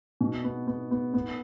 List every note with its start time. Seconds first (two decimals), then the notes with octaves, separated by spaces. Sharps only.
0.21 B2
0.44 B3
0.67 B3
0.91 B3
1.14 B3